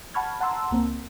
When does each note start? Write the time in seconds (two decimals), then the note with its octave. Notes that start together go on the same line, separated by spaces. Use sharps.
0.14 F#5 A5 B5 C#6 F6 G#6
0.41 F#5 A5 A#5 C6 E6
0.71 C#2 A#3 C4